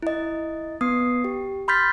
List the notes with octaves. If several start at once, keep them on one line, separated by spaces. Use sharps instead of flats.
E4 D#5
B3 D#6 C7
G4
B5 C6 F6 G6 A6 B6